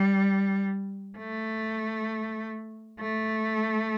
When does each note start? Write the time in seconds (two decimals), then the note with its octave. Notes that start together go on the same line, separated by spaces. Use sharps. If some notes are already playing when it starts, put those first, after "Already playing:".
Already playing: G3
1.18 A3
3.01 A3